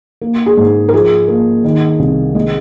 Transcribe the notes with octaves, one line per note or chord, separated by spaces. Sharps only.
A#3
G#4
G#2
A#4
F3 G#4
A#3
D#3
C2
G#3